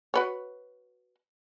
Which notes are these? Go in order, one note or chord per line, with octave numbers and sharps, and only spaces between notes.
F#4 B4 C#5